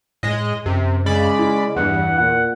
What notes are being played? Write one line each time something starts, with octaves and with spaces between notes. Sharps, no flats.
A2 G#3 D#5
F#2 C3
C#3 G#3 D5 B5
E4
E2 G2 F#5
A#2 F#5